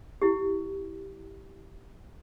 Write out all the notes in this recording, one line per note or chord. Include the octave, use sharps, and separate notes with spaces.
E4 G4